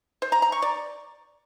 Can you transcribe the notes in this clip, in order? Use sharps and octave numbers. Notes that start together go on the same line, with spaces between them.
C5
A#5
A#5
C#6
D5